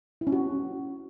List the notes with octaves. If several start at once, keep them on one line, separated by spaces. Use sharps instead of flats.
E4
C#4
F#4